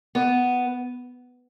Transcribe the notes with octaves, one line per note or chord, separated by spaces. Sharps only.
B3